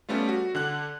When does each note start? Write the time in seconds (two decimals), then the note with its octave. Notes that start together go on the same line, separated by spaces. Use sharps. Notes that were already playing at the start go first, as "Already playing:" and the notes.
0.09 G3 A3 B3 C#4 F4
0.29 F#4
0.55 D3 F#5 F#6